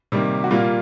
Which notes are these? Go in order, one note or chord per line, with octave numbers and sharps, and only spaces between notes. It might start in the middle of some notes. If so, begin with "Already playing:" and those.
C3 D#3 G3 A#3
F#4
A#2 G3 A#3 F4